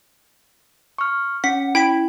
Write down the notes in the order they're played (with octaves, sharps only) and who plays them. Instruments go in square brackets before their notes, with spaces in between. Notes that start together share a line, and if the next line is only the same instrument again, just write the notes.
[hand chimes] C#6 F6
[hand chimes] C#4 [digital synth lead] F#5 [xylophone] B6
[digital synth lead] E4 [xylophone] G5 B6 D7